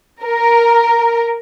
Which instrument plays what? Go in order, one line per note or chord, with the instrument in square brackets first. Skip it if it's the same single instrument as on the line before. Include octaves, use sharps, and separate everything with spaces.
[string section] A#4